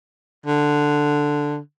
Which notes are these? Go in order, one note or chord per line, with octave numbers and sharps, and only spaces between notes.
D3